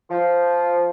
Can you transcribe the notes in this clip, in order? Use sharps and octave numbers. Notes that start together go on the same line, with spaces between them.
F3